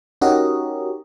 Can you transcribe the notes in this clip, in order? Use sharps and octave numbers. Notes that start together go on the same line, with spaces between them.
C#4 D#4 F#4 G4 A#4 D#5